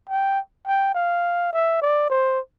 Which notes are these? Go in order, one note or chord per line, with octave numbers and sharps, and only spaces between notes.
G5
G5
F5
E5
D5
C5